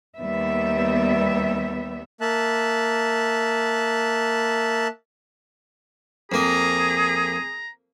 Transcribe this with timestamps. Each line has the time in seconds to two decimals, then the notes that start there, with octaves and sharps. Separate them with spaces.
0.18 D#2 G3 B3 E5
2.21 A#3 E5 A5 F#6
6.32 F2 A#3 G#4 A#5